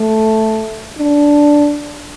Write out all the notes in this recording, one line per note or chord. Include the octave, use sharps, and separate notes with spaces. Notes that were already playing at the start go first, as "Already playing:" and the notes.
Already playing: A3
D4